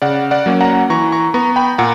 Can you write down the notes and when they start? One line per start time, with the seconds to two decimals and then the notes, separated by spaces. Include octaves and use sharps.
0.02 C#3 D5 F#5
0.31 D5 F#5
0.46 F#3 A#3 C#4
0.61 F#5 A#5
0.90 E3 A#5 C#6
1.12 A#5 C#6
1.34 B3 A#5 C#6
1.56 G5 B5
1.78 A#2 F#5 A#5